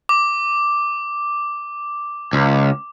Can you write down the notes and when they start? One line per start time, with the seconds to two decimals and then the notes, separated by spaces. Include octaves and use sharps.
0.09 D6
2.33 C#2